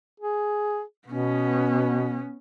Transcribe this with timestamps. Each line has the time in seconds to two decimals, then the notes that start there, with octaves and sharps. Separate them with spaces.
0.20 G#4
1.08 B2 B3 C#4